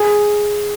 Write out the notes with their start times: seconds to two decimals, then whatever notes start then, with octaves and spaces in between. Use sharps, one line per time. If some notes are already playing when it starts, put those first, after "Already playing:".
Already playing: G#4